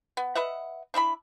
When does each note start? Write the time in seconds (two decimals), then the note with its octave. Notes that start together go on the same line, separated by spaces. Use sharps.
0.17 B3
0.35 B4 D#5 E5 F#5
0.94 D4 E4 D#5 B5